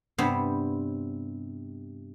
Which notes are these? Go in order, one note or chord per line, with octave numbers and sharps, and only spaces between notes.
G2 C3 B3 C5